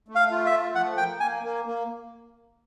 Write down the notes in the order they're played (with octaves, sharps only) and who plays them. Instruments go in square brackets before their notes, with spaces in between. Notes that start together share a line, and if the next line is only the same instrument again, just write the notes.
[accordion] A3
[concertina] F5
[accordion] F4
[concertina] E5
[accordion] A3
[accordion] F3 [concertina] F#5
[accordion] A#3 [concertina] G5
[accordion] A#3 [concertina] G#5
[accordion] A#3
A#3